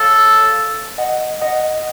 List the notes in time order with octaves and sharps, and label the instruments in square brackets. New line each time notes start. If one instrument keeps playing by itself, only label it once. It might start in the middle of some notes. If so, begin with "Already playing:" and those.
Already playing: [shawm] A4 [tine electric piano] C#5 F5
[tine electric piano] D#5 F#5
D#5 F#5